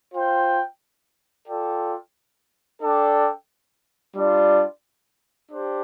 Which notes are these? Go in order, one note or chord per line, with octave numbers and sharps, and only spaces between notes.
F4 C5 G5
F4 A4 D5 G5
D4 A4 D5 G5
G3 D4 F4 D5
D4 G4 C5